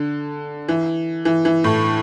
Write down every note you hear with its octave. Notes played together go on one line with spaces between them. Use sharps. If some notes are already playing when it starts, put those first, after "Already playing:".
Already playing: D3
E3
E3
E3
A2